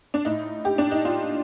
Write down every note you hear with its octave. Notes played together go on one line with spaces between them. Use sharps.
D4
A2 D#4
G4
D4
D#4
F4